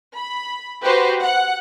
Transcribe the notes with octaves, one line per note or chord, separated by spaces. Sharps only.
B5
F#4 G4 B4 C5
F#5